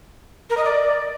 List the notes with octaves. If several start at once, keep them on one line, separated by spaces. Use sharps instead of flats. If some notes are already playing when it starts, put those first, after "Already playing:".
A#4
D#5
D5